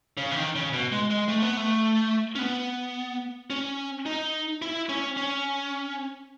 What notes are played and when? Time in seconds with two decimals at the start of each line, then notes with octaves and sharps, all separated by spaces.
0.17 C#3
0.32 E3
0.36 D#3
0.55 C#3
0.73 B2
0.92 G#3
1.10 G#3
1.29 A3
1.42 B3
1.57 A3
2.35 C#4
2.39 B3
3.50 C#4
4.06 D#4
4.62 E4
4.89 C#4
5.17 C#4